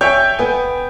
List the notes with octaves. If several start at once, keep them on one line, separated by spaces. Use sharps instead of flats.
C#5 E5 G5 G#5
B3 G#5